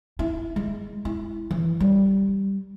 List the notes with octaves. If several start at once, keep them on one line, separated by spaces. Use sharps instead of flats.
E4
G#3
E4
E3
G3